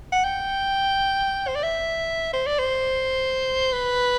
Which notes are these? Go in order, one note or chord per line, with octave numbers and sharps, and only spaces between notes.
F#5
G5
C5
D5
E5
C5
D5
C5
B4